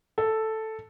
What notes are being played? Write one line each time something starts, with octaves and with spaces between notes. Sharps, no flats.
A4